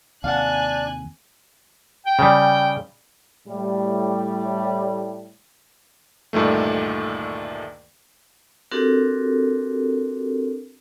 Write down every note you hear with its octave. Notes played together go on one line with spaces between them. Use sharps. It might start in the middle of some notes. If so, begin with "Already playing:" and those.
D#2 C3 D4 F5 F#5 G#5 F#6
G5
C#3 G3
A2 G3
D2 G2 A#2 D#3 A3
C4 D4 F#4 G4 A4 A#4